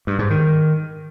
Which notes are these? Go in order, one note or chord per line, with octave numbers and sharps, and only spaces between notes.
G2
G#2
D#3